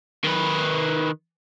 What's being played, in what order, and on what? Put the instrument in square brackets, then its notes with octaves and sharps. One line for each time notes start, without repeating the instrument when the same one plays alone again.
[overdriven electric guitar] D#3 B4